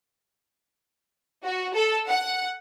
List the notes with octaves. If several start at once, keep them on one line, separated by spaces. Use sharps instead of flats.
F#4
A4
F#5